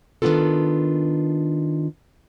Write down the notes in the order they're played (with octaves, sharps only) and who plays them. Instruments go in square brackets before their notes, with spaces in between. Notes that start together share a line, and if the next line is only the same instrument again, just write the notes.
[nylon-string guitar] D#3 A#3 B3 D4 F4 A4